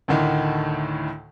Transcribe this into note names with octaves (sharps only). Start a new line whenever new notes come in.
D2 A2 D3 D#3